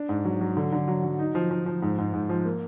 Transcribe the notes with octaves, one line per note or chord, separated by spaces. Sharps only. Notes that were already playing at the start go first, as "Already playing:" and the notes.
Already playing: D4
G#2
F#3
F#3
D3
D3
F#3
F#3
D#4
F3
F3
F3
G#2
G#2
G#2
F3
A#3